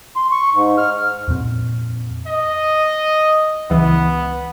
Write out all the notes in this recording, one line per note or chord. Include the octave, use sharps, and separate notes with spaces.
C6
C#6
G#2
F6
F2 A#2 C4
D#5
C#2 E3 B3